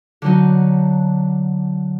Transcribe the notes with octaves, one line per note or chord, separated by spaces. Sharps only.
D3 F#3 D#4